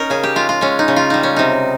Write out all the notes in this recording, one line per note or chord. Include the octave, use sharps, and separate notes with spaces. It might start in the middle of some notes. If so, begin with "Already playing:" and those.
Already playing: C#4 D#4 A#4
C#3 G#4
G4
G#3 F4
F4
G#3 C#4
D#4
C#3
F4
G3 D#4
C#4
C3 D#4